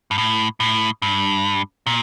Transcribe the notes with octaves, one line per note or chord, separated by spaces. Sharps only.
G2
A2
A2
G2
A#2